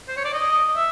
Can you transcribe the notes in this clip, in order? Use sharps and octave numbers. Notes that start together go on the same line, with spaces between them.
C5
C#5
D5
D#5
E5